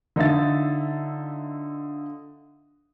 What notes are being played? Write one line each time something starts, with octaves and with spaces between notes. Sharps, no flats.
D3 D#4 F4 E5 A6